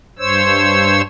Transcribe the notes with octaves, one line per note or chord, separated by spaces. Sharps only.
G2 C5 C#5 E6